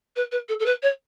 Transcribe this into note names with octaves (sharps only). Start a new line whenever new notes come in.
B4
B4
A4
A4
B4
C#5